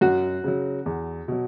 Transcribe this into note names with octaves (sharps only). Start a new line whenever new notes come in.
F#2 F#4
C#3 F#3
E2
B2 F#3